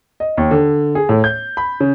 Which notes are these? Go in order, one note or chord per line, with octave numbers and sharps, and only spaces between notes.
D#5
D#2
D3
G#4
A2
G6
B5
C#3